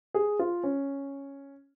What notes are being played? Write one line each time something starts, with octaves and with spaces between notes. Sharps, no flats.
G#4
F4
C#4